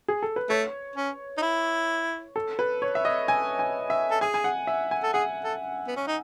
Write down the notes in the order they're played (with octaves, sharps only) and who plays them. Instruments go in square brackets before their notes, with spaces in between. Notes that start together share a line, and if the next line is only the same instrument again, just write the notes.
[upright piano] G#4
A4
B4
[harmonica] A3 [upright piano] C#5
[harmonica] C#4
D#4
E4
[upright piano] A4
B4
C#5
E5
D#5
G#5
G#5
E5
[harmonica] A4
[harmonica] G#4 [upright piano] G#5
[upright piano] G#5
F#5
E5
G#5
[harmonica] A4
[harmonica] G#4 [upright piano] F#5
[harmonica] A4
B3
C#4
D#4